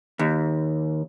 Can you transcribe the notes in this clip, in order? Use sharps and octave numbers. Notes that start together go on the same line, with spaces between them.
D#2